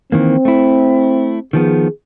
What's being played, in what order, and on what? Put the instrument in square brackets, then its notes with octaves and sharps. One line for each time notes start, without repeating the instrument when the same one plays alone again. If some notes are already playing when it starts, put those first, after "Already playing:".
[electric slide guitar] D#3 E3 A#3 [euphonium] C4
[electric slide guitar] A3 E4
[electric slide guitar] D#3 F3 B3 [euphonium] G#4